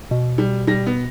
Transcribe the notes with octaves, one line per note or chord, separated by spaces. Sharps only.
B2
G3
G3 A#6
B3